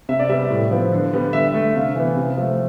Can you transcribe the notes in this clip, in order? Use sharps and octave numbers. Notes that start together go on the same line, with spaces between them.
C3 E5
D5
G3 B3 E5
A2
F3 B3
D3
G3 B3
D3 E5
A3
C3 F5
E3 B3
C3
F3 A3